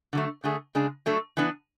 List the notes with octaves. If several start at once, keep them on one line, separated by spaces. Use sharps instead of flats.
D3 F#3 A3
D3 A3 D4 G#4
C#3 G#3 D4 G#4
F#3 A3 D4 A4
E3 B3 D4